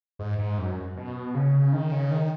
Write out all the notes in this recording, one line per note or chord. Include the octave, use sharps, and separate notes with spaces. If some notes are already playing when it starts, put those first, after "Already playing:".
G#2
G#2
F#2
B2
C#3
D#3
C#3
D#3